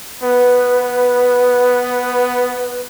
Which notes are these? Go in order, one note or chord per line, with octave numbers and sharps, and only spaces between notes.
B3 B4